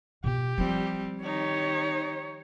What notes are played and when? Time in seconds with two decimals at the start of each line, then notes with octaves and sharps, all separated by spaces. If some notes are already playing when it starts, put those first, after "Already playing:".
0.24 B2 F4 G4
0.58 F3 G3 C4 F4
1.24 D#3 D#4 G4 C#5